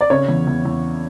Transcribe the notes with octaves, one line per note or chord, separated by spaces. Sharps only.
D5
C#3 C#5
E2
E2
E2